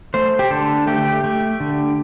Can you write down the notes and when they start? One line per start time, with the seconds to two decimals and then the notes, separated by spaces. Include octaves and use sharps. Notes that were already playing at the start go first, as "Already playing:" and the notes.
0.14 A3 C5
0.39 G4
0.51 D3 A4
0.87 A3 G4
1.24 A3
1.60 D3